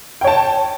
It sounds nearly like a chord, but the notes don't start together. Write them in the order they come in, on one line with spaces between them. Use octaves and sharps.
G5 C#5 A5